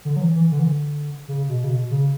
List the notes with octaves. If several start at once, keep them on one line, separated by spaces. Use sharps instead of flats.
D3
F#3
E3
E3
D3
E3
D3
C#3
B2
C#3
B2
C#3